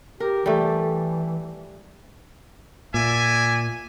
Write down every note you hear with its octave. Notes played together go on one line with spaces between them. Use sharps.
G4 A#4
E3 G3 A3
A#2 D5 E5 G#5